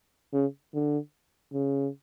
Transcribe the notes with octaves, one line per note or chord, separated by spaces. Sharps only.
C#3
D3
C#3